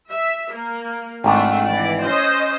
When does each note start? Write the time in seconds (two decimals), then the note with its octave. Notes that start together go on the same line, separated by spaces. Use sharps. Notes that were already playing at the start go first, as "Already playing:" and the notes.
0.10 E5
0.53 A#3
1.24 G#1 A3 D4 F4
1.64 E3 D5
2.01 C#4 C5 D#5